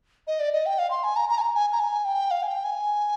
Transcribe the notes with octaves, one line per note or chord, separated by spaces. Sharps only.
D#5
D5
D#5
G5
F5
C6
G#5
A#5
A#5
G#5
A#5
G#5
A#5
G#5
G5
F5
G#5
G5
G#5